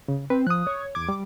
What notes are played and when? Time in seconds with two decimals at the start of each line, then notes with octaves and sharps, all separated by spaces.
0.08 C#3
0.30 C4 B4
0.47 F3 D#6 F#6
0.67 C#5
0.95 E2 D6 G#6
1.09 G3